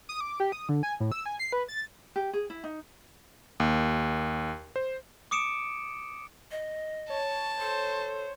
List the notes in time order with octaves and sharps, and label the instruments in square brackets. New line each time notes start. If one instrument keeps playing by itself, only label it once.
[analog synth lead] D#6
D6
G4
D#6
D3
G#5
A2
E6
G#5
C7
B4
A6
[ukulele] G4
G#4
E4
D#4
[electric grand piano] D#2
C5
[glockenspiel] D6 D#6 C#7 D7 E7
[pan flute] D#5
[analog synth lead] C#5 [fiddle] A5
[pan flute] A4 [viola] C5